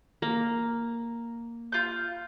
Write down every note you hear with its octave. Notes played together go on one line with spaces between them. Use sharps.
A#3
F4 G6